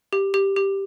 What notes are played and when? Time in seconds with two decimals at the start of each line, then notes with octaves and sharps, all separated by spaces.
0.13 G4
0.34 G4
0.56 G4